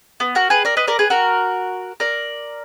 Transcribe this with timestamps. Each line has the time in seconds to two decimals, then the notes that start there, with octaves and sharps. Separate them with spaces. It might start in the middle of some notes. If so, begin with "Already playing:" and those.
0.20 B3
0.35 F#4 A#4
0.50 G#4 B4
0.65 A#4 D5
0.77 B4 D#5
0.87 A#4 D5
0.99 G#4 B4
1.10 F#4 A#4
2.00 A#4 D5